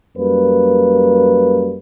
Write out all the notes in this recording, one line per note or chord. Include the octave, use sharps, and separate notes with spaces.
F#2 G3 A#3 B4